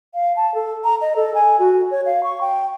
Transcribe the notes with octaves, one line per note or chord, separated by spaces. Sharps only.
F5
A5
A4
A#5
D#5
A4
G#5
F#4
C#5
F5
C#6
G5